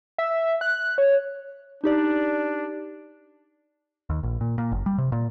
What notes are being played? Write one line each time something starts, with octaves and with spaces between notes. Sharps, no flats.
E5
F#6
C#5
D4 D#4 G4 D5
D#2
A#1
A#2
A#2
F#1
G3
C3
A#2